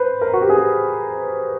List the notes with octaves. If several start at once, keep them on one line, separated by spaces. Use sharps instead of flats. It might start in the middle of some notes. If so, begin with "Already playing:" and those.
Already playing: B4 C5
A#4
F#4
G4
G#4